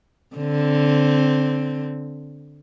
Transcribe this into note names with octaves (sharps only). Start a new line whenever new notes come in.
D3 C4